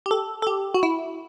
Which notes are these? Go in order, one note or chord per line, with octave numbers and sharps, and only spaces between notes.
G4
A4
A4
G4
F#4
E4